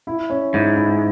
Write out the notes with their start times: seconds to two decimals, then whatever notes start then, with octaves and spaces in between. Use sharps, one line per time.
0.07 E4
0.30 C#4
0.53 G#2 E4
0.76 E4